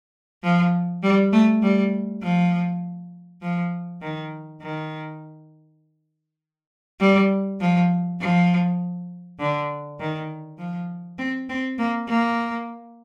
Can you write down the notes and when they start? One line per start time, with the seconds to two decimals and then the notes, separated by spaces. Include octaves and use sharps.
0.43 F3
1.03 G3
1.33 A3
1.62 G3
2.23 F3
3.42 F3
4.02 D#3
4.62 D#3
7.00 G3
7.61 F3
8.21 F3
9.40 D3
10.00 D#3
10.59 F3
11.19 C4
11.49 C4
11.78 A#3
12.08 A#3